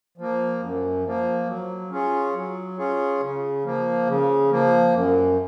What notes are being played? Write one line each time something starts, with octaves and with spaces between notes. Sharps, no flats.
F3 A#3
F#2
F3 A#3
F#3
C#4 F4 G#4 C#5
F#3
C#4 F4 G#4 C#5
C#3
F3 A#3
C#3
F3 A#3
F#2